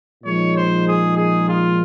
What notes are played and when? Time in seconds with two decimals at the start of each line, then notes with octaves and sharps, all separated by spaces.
0.23 A#2 F3 G#3 D#4 C#5
0.54 C5
0.86 G#4
1.17 G#4
1.48 F4